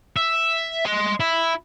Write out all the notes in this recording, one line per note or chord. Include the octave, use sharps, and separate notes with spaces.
E5
D#5 C6
E4